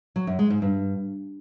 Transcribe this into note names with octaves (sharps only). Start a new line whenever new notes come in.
F#3
F#2
G#3
G#2
G2